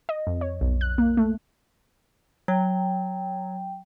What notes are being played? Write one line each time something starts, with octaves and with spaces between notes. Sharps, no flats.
D#5
F2
C#5
B1
F#6
A#3
A3
F#3 G5